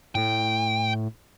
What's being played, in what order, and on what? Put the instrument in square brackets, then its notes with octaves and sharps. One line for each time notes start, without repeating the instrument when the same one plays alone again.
[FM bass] A2 [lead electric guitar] G5